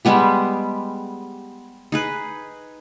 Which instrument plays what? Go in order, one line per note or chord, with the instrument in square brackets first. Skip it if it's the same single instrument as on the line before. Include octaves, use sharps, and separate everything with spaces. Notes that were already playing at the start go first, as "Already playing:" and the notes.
[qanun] G3 G#3 B3 G4
D#4 G#4 B4